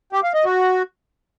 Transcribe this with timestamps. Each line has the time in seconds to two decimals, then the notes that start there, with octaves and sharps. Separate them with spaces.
0.13 G4
0.23 F5
0.34 D#5
0.45 F#4